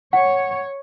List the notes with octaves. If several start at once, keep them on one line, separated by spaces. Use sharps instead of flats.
C#5 F#5